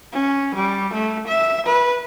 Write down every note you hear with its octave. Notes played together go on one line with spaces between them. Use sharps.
C#4
G3
A3
E5
B4